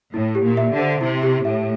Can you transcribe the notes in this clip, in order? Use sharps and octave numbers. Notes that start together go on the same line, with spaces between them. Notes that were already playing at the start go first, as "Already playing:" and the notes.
A2 E4
G4
A#2
E5
D3
C5
C3 E4
G4
A2 E5